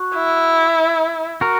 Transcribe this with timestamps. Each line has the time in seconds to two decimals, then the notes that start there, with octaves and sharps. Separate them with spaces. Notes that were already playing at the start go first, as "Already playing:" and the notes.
Already playing: F#4
0.15 E4
1.41 F#4 A#4